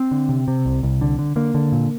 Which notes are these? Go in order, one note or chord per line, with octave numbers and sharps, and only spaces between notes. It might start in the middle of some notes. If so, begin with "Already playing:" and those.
Already playing: C4
D3
C3
C3
C2
C2
D3
D3
D3 A#3
D3
A#2